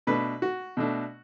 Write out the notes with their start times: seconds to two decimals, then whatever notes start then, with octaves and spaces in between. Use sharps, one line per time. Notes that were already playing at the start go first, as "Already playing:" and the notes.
0.07 B2 A3 D4 B4
0.42 F#4
0.77 B2 A3 D4